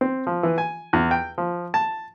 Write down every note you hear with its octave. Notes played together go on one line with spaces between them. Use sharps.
C4
F3
E3
G#5
E2
G5
F3
A5